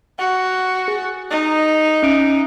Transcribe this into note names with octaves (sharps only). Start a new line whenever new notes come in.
F#4 F#5
G#4
D#4
C#4 E5 D7